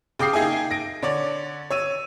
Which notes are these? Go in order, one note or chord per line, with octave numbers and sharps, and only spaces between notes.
C#3 G5 D6 D#6 C7
A#3 D#4 G#4 E5 G5 G#5
A#6 D7
D3 C#5 D5
C#5 E6 D#7